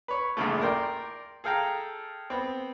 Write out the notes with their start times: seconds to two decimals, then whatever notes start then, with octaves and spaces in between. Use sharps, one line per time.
0.08 B4 C#5
0.37 A#1 E2 G2 C#3 A3
0.61 A#4 D5 G5 C6
1.44 G#4 A4 F5 G5 A#5
2.30 B3 C4